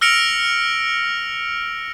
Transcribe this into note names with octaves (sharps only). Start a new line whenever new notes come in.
E6 F6 A#6 C#7 D7 F7